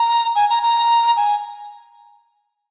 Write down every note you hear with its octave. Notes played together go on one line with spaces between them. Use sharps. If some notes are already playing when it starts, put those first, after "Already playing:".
Already playing: A#5
G#5
A#5
A#5
G#5